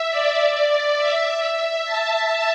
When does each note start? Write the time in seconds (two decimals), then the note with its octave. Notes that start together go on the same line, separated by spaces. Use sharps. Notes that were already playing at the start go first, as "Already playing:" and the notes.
Already playing: E5
0.11 D5
0.69 D5
0.98 E5
1.56 E5
1.85 A5